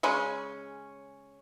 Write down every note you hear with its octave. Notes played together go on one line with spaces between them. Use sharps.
C#3 G#3 C#4